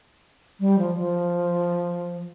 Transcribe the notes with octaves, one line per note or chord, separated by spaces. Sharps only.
G3
F3
F3